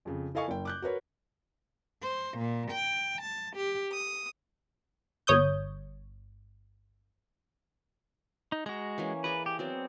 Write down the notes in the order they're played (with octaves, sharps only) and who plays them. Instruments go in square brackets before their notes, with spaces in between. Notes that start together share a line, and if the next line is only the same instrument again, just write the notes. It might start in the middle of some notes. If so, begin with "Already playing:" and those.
[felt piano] F2 C#3
E4 A4 D#5 F5 G#5 C#6
F#1 G5
D6 F#6 G6
F#4 A#4 B4 C#5
[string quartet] C5
A#2
G5
A5
G4
D#6
[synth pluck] G1 C#5 D#6 G6
[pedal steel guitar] D#4
[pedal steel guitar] G#3 F#4 [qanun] A#5
[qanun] E3 A#3 C#4
[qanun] G#4 D5 A#5 [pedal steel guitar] B4
[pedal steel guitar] G4
[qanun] F#3 B3 D5 [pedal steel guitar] C4